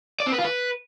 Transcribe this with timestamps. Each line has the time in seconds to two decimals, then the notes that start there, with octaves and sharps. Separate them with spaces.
0.20 D5
0.26 C4
0.32 B4
0.38 F4
0.45 B4